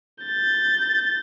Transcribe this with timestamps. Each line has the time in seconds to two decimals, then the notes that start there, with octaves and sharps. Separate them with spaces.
0.23 G6 A6